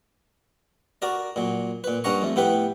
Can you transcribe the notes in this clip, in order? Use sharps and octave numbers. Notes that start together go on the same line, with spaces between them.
F#4 A#4 D5
A#2 F#3
A#2 B4
G2 A#3 C#4 F#5 A#5 C#6
F2 A3
A2 B3 G4 B4 B5